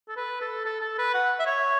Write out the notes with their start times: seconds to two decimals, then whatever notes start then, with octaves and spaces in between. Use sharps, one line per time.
0.08 A4
0.17 B4
0.41 A4
0.65 A4
0.81 A4
0.98 B4
1.14 F#5
1.40 E5
1.46 C#5